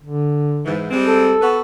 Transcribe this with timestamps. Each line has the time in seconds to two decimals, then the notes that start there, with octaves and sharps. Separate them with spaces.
0.03 D3
0.65 G#2 E3
0.91 G3 G#3 C4
1.06 A4
1.42 B3 F#4 B4